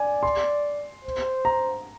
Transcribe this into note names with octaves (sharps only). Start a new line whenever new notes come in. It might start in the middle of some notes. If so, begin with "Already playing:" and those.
Already playing: D5 G#5
C6
C5
A#5